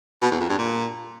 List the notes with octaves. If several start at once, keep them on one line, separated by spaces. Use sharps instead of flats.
B2
E2
F2
G2
A#2